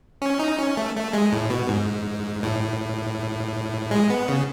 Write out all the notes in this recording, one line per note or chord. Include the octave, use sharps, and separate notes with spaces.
C#4
D#4
C#4
A3
A3
G#3
A2
B2
G#2
A2
G#3
B3
C#3